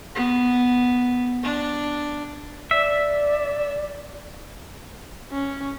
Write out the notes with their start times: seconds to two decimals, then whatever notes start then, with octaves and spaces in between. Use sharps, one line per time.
0.15 B3
1.43 D4
2.71 D5 E5
5.32 C#4